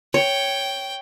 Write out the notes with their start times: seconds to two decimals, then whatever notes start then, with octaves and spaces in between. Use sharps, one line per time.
0.14 C#5 G5